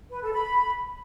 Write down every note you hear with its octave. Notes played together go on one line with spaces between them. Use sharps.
B4
A4
B5